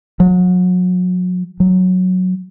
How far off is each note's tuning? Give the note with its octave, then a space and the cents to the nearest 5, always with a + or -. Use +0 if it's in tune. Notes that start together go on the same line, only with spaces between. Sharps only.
F#3 -35
F#3 -10